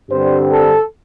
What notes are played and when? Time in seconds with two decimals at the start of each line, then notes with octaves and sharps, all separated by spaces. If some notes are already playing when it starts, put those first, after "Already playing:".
0.10 G2 D3 G3 C4 C5
0.51 A4